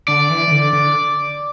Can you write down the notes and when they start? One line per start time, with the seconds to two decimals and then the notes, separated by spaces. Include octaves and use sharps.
0.08 D3 D5
0.30 E3
0.48 E3
0.52 D3
0.73 D3